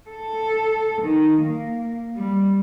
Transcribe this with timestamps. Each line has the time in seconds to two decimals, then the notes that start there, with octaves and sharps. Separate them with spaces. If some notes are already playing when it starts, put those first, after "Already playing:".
0.10 A4
1.02 D#3
1.42 A#3
2.16 G3